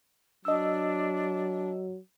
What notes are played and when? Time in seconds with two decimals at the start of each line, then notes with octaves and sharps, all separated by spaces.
0.45 F#3 D4 D#5 E6